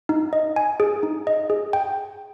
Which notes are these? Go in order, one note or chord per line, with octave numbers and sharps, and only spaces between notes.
D#4
D#5
G#5
G#4
D#4
D#5
G#4
G5